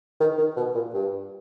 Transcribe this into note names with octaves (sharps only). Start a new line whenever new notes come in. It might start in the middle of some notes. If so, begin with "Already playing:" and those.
D#3
D#3
B2
A#2
G2